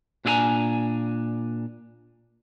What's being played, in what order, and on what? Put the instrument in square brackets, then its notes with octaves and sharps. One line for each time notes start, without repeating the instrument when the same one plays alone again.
[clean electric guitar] A#2 D4 F4 G#4 G#5 A#5